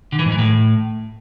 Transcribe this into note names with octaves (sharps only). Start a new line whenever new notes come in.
D3
E3
G#2
E3
A2